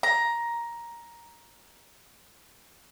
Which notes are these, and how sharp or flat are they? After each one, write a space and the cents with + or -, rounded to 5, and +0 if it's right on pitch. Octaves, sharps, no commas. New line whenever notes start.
A#5 +10